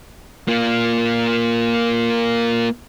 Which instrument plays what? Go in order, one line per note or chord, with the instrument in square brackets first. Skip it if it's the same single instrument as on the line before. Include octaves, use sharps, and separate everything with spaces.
[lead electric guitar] A#3 F4